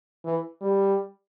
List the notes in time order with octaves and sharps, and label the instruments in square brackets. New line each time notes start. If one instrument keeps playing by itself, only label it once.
[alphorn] E3
G3